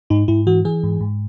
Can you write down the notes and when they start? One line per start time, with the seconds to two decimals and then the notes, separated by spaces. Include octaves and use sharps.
0.10 G#2 D#4
0.28 G#2 E4
0.47 E3 F#4
0.65 E3 G#4
0.83 G#2
1.01 G#2